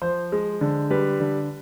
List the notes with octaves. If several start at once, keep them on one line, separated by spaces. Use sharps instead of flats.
F3 C5
G#3
D3
G3 B4
D3